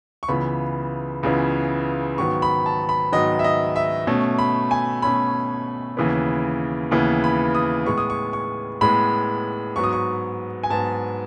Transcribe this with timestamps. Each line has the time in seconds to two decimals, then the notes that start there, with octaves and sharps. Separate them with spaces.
0.23 C#6
0.28 C#2 C#3 E3 B3 B5
1.23 C#2 C#3 E3 B3
2.18 G#2 D#3 F#3 B3 C#6
2.42 B5
2.66 A5
2.89 B5
3.12 G#2 D#3 F#3 B3 D#5
3.39 E5
3.44 D#5
3.76 E5
4.07 B2 A3 C#4
4.39 B5
4.71 G#5
5.02 B2 A3 C#4 B5
5.97 D#2 C#3 E3 B3
6.91 D#2 C#3 E3 B3
7.24 B5
7.55 D#6
7.86 A2 G#3 B3 C#6
7.98 D#6
8.10 C#6
8.33 C#6
8.81 A2 G#3 B3 B5
9.76 G#2 F#3 B3 C#6
9.84 D#6
9.93 C#6
10.63 G#5
10.70 G#2 F#3 B3 A5